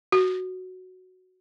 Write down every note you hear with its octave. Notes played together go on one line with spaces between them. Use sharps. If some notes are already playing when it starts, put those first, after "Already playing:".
F#4